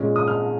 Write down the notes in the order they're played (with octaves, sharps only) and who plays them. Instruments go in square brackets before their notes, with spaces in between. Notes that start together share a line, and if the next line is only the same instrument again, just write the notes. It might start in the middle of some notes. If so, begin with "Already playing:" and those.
Already playing: [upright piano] A#2 G#3 C#4
D#6
F6